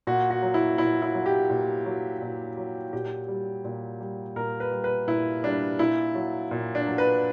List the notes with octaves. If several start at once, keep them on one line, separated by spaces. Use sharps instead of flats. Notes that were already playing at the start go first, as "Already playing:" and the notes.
A#2 F#4
F#4
F#3
E4
A#2 E4
E4
F#3
G4
A#2
F#3
A#2
F#3
A#2 G4
G3
A#2
G3
A#2 A#4
B4
G3
B4
A#2 E4
G3 D4
A#2 E4
F#3
A#2
D4
F#3
B4